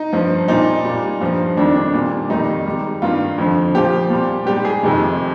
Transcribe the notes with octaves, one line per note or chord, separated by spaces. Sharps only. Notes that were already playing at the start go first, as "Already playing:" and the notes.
Already playing: D#4
G2 F3
A#2 G3 D#4
A#2 G3
G2 F3
F2 D#3 G3 D4
D4
A#2 G3
F2 D#3 G3 D#4
G#2 G3
G2 D#3 G3 F4
F2 D3 F3
A#2 F3 G4
A#2 G3
G#2 G3 G4
G#4
F2 C3 D#3